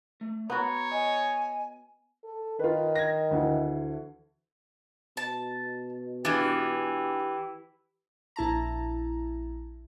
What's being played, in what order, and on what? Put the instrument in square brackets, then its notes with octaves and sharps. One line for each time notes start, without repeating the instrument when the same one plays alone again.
[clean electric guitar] A3
[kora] B3 F#4 [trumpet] C#5 [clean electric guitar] A#5
[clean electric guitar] D#5 [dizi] G#5
[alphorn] A4
[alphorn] D#3 [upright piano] F4 B4
[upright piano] G#6 A#6
D2 D3 E3
[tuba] B2 [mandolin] A5
[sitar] E3 [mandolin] D4 F4 G#4 [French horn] G4
[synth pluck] A#1 E4 A5 A#5